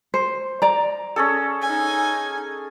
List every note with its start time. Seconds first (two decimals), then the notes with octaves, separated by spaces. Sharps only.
0.14 C5
0.62 D5 A#5
1.16 C#4 G#4 A4
1.62 D#4 G#5